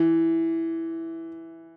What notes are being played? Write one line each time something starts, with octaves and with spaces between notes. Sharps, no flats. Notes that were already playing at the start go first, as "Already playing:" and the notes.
Already playing: E3